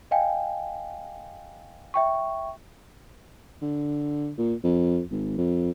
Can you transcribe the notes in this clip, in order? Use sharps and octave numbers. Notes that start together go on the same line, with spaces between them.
D#5 F5 G5 G#5
E5 G5 C#6
D3
A#2
F2
G#1
F2